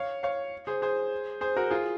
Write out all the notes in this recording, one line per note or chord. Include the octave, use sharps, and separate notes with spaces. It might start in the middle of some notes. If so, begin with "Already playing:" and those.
Already playing: C#5 F5
C#5 F5
G#4 C5
G#4 C5
G#4 C5
F#4 A#4
F4 G#4